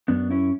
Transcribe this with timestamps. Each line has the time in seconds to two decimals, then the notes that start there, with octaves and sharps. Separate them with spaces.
0.08 F#2 B3 D4
0.30 C#4 E4